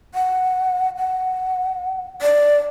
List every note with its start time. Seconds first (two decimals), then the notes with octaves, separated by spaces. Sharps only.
0.15 F#5
0.97 F#5
2.22 D5